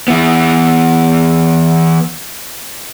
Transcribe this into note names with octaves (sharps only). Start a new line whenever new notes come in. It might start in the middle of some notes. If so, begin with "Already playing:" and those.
E3 B3